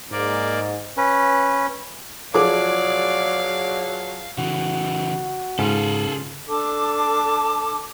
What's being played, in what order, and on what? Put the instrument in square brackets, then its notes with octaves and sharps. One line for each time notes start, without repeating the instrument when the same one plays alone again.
[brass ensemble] G#2 [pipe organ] A#3 D5
[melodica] C#4 B4
[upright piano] F3 G#4 D6 [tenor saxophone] F#3 [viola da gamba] D5 [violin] F5
[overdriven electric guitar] C#3 E3 [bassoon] F#4
[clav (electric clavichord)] G#2 [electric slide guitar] C#3 F4 [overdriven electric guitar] G#4 A4
[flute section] D4 A4 A5 D6